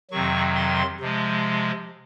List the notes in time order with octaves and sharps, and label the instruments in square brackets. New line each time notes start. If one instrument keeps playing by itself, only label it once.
[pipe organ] F2 C3 D#3 F#3 C#6
C6
C3 F3 G#3